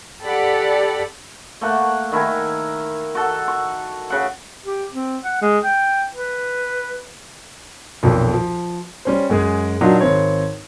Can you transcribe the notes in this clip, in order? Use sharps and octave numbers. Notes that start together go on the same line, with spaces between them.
G4 A4 D5 F#5 B5
A3 A#3 F#5
D#3 E4 A#4 G#5
F#4 A4
C#6
C#3 F#5
G4
C4
F#5
G#3
G5
B4
B1 F2 A#2
F3
G3 C#4 C5
F#2 G#3 G#4
A#2 F#3 D4 D#4 F4 F#4
G#1 C4 C5 C#5